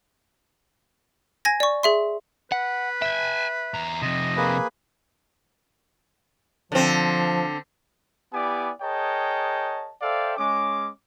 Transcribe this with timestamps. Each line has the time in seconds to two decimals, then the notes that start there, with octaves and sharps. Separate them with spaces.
1.45 G#5 G#6 A#6
1.60 D5 C#6
1.83 G#4 E5 C6
2.52 B4 F#5
3.02 E5 G5 G#5
3.74 E2 A#5
4.02 F2 C3 D#5
4.37 A#3 G#4 B4
6.72 D3 F3 C4
8.33 B3 E4 G4 D5 G#5 D6
8.82 G#4 A#4 C#5 D#5 G5 A5
10.02 A4 C5 D5 E5 F5 G5
10.38 G#3 C#4 D6